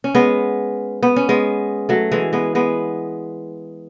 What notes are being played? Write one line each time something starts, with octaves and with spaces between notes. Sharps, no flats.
C#4
G#3 B3
B3
C#4
G#3 B3
F#3 A3
E3 G#3
G#3 B3
G#3 B3